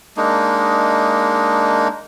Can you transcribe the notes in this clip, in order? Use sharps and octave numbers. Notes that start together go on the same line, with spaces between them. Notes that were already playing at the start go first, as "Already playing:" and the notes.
G#3 A#3 D4 D#4